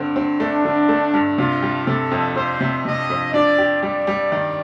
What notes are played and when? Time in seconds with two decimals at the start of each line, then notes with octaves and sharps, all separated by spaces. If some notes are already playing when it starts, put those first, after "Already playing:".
Already playing: G2 D3 C4
0.16 C4
0.40 A3 D4
0.65 D3
0.89 A3
1.14 G2
1.38 C3 F4
1.62 G3
1.87 C3 A4
2.11 F2
2.35 F2 C5
2.60 C3
2.85 C3 D#5
3.10 F2
3.34 D4 D5
3.58 G4
3.83 G3 D5
4.07 G3
4.32 D#3